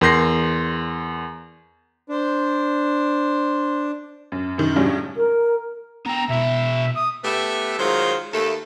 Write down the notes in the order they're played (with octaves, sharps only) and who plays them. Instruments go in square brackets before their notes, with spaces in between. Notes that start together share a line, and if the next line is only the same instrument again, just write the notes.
[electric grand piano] E2 A#4 C6 G6 A#6 C7
[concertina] D4 [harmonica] C5
[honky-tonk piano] F#2
F#2 D#3
A2 C#3 F#3 G3 C#4 D4
[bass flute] A#4
[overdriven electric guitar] B3 G5 [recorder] A#5
[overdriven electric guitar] B2 E4 [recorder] E5
[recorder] D#6
[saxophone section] A3 B3 G4 A4 B4 E5
D#3 F#3 G#3 F4 C5
D#2 A3 A4